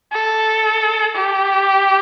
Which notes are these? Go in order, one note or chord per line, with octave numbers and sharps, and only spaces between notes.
A4
G4